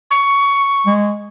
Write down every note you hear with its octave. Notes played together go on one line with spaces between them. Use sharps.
C#6
G#3